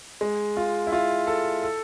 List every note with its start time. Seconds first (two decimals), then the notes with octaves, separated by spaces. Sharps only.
0.21 G#3
0.57 F4
0.87 E4
0.92 F4
1.27 A4
1.63 A4